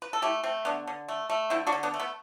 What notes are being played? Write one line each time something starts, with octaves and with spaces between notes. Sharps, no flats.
B4
A4
A3 E4 G4
A3 C4
D3 B3 D4
D3
A3
A3
D3 C4 E4
D4 F#4
D3
B3 D4
A3
B3